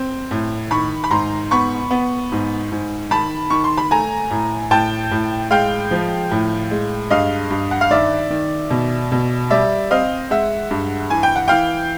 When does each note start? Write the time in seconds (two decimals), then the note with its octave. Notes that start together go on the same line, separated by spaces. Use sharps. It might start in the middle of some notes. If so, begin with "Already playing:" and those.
Already playing: C4
0.31 A2
0.71 D#3 B5 C#6
1.04 B5
1.11 G#2 A#5 C6
1.51 B3 B5 C#6
1.91 B3
2.32 G#2
2.72 G#2
3.11 D#3 A5 B5
3.50 D#3 C#6
3.64 C6
3.78 B5
3.91 A3 G#5 A#5
4.30 A2
4.71 A2 G5 A5
5.11 A2
5.50 G#3 F5 G5
5.91 F3
6.31 A2
6.71 G#3
7.10 G2 D#5 F5
7.50 G2
7.71 F#5
7.81 F5
7.90 D#3 D5 E5
8.30 D#3
8.70 B2
9.12 B2
9.50 G3 D5 E5
9.91 C4 D#5 F5
10.30 G#3 E5 F#5
10.71 G2
11.10 E3 G#5
11.23 G5
11.36 F#5
11.48 E3 F5 G5